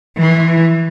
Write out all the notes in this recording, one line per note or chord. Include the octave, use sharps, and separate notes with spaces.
E3